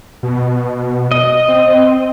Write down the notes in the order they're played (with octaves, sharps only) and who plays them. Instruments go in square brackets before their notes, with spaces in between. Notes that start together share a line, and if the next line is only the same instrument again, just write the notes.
[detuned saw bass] B2
[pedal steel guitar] D#5
[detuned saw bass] C4